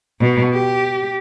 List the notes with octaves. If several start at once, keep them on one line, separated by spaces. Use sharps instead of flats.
B2
G4